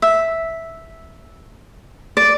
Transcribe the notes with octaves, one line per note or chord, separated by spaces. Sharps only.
E5
D5